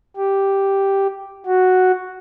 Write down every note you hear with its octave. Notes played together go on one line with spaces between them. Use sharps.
G4
F#4